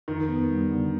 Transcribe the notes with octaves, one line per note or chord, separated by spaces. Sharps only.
F2 D#3
B3
G3
D3